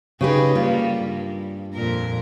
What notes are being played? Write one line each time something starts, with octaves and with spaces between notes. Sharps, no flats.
C#3 D#4 G4 G#4 B4
G3 A#3 F4
G2
F2 A#2 A#4